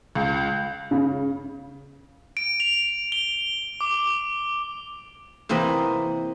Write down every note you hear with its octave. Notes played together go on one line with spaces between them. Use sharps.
C#2
C#3
D7
F7
G7
D6
C3 E3 A#3 C4 D#5 B5